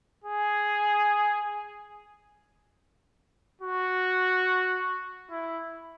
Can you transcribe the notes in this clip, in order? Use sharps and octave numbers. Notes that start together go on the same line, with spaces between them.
G#4
F#4
E4